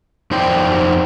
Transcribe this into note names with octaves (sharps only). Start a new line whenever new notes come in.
F2 D#4 C5 D5 G5